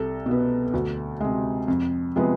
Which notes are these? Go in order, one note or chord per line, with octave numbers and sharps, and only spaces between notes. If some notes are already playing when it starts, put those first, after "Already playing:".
Already playing: C2 A4
B2
B3
D2
C3 G#3
F2
C3 F3 G#3 B3